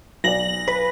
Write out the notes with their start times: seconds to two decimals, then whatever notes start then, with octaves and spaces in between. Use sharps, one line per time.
0.24 B1 D5 A#6 F#7
0.68 B4